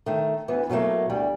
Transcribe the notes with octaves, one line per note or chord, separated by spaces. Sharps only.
D#3 A3
D2 E3 B3
B2 F#3 G3 A3 A#3
D2 G3